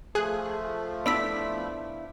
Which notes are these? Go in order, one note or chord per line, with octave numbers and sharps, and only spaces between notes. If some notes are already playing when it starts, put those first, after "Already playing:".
F3 A3 G#4 F#6
B3 D4 E4 B5 E6 B6